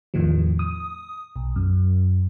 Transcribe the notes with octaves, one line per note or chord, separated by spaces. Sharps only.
E2 A2 D#3 F3
D#6
B1
F#2